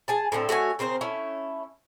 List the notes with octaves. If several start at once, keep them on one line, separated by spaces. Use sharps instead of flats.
G#4 G#5 A5
A2 D3 A#3 C4
A3 F#4 C#5 G#5
C#3 C4 A#4 C5
A3 C#4 E4